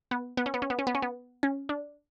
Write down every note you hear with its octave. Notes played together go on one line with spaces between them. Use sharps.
B3
B3
C#4
B3
C#4
B3
C#4
B3
C#4
B3
C#4
D4